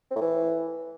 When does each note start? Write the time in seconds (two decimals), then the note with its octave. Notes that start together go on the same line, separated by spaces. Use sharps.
0.11 C4
0.16 A2
0.21 E3